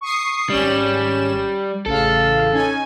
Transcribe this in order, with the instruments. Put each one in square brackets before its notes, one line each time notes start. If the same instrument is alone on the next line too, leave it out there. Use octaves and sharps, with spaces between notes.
[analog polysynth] C#6 D#6 C7
[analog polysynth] G#1 C#4 E7 [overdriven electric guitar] G3
[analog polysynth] A1 C#3 F5 [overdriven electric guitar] A4
[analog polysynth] C#4 D#4 G#5